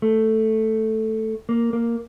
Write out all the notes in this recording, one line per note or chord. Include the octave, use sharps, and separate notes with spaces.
A3
A#3
A#3